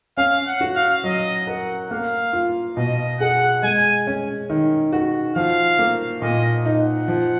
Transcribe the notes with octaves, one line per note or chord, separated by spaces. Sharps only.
C#4 F5
F#5
F#4
F5
F#3 D#5
A#4 F#5
A#3 F5
F4
B2 D#5
G#4 F#5
G#3 G#5
C#4
D#3
F#4
F3 F5
A#3
A#2 D#5
D#4
F#5
F3